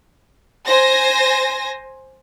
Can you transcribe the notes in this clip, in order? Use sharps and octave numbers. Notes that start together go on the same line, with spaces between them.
C5 G#5 A#6